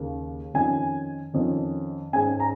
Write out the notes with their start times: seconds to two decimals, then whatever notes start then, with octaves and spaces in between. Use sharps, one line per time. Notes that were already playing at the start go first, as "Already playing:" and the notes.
Already playing: D#2 C#3 A#3
0.54 F2 D#3 C#4 G#5
1.34 F2 D#3 C#4
2.13 G#2 G#3 C#4 G#5
2.40 A#5